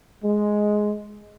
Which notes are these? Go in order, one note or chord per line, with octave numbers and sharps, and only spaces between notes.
G#3